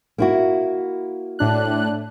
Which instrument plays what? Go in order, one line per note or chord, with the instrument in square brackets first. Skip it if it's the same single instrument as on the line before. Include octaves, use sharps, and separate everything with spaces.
[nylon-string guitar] A#3 E4 F#4
[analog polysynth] A2 D4 F#6